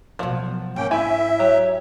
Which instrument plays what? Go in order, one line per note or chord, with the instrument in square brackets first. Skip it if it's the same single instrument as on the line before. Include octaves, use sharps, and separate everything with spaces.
[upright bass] B2 F#3 [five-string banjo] F3 F#5
[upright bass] G#2 [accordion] A#3 C#4 G5
[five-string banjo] E4 G#5 [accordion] E5
[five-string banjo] F#3 G4 A#5 [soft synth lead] C#5